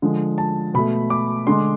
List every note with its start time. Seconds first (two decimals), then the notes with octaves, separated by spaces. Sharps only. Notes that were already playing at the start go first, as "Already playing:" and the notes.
0.02 D3 F3 G#3
0.38 A5
0.74 B2 A3 B5
1.10 D6
1.47 D3 G#3 C6